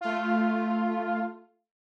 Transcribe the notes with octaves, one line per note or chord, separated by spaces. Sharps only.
A3 F4